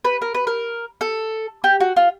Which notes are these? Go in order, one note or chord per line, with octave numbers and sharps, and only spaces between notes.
B4
A#4
B4
A#4
A4
G4
F#4
F4